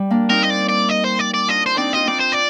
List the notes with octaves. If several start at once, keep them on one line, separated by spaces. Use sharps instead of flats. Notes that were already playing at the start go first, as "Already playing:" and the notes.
Already playing: G3
A#3 D4
C4 D#4 A#4
D#5
D5
D5
D#5
C5
D5
D5
D4 F4 D#5
C5
C4 D4 D#4 D5
F4 D#5
C4 D#4 D5
C5
D5